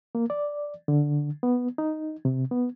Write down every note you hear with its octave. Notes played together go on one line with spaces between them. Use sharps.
A#3
D5
D3
B3
D#4
C3
B3